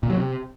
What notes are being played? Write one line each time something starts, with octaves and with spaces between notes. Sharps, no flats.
A#2
F#3
C3